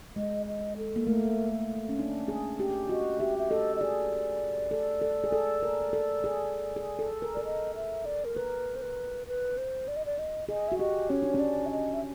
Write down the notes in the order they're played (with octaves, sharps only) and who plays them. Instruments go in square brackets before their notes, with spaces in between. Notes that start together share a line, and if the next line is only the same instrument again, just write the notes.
[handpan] G#3 [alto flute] D#5
[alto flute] D#5
A4
[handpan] A#3
[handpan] A3 [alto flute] A#4
[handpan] C#4
D4
G#4
G4
[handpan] F#4 [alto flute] D#5
[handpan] G4 [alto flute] E5
[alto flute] E5
[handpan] A4 [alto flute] D#5
[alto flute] D#5
[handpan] G#4 [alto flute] D5
[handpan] A4
A4
G#4
A4
A#4
A4
G#4
G#4
A4
A#4
[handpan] A#4 [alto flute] D5
[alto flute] D#5
E5
D5
A#4
[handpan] A#4 [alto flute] B4
[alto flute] C5
B4
B4
C5
D5
D#5
D5
D#5
[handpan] G#4 [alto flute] D#5
[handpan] F#4 [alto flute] E5
[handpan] G4 [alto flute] D#5
[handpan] C#4 [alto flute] C#5
[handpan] D4
C#4
[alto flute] D5
E5
D#5
E5